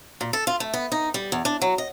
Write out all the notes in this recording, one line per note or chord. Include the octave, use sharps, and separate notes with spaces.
A#2
A4
F4
A3
B3
D#4
G3
E2
D4
F#3
D#5